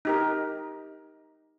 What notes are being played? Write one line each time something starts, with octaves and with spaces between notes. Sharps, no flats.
D#4 G4 A#4